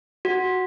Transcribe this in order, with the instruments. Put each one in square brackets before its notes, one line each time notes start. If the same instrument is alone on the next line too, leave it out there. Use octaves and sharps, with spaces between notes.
[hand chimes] F#4